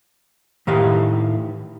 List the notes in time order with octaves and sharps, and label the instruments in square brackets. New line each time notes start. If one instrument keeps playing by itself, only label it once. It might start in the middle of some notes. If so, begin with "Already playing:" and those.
[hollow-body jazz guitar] A2 D#3 G4 F5